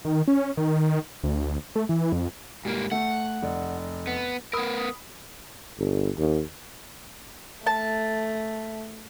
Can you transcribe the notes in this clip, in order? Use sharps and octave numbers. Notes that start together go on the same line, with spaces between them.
D#3
C#4
D#3
D2
A3
E3
F2
G#2 G3 A#3
A3 F#5
F1 D5
B3
B3 A#4 B5 D#6
G1
D#2
A3 A5